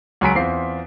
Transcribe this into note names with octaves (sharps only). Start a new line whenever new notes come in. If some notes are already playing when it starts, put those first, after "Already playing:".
C#2 F#3 G#5 A#5 B6 D7
E2 C4 F4 C7